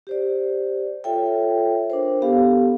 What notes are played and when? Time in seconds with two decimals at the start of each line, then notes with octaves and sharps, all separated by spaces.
0.07 G4 C5 D5
1.04 F4 A4 C#5 E5 G5
1.90 D4 A#4 C5
2.22 B3 G4 A4 F5